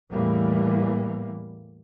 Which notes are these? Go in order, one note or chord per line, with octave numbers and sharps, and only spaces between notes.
E2 A2 E3 G3 A#3